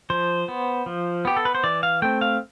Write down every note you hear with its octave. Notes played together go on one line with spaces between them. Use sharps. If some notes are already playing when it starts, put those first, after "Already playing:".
F3 C5
B3
F3
B3 G4
A4
B4
C5
E3 D5
F5
A3 C4 G5
F5